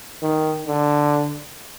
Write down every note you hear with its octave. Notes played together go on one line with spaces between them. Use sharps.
D#3
D3